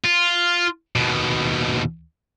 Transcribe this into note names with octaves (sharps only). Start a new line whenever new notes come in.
F4
D#2 B2